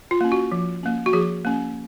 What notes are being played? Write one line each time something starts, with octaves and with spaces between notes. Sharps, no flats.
F4
A#3 C#4
F#4
F3
A#3 C#4
F#4
F3 G#4
A#3 C#4